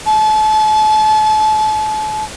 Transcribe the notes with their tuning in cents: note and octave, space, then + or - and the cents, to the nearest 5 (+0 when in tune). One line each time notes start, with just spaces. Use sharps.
A5 -35